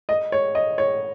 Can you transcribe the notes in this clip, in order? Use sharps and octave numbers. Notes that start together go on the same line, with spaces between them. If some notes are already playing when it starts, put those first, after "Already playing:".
D#5
C#5
D#5
C#5